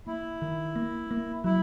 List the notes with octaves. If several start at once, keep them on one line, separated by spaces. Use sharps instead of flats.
A#3 E4
D#3
A#3
A#3
F#3 E4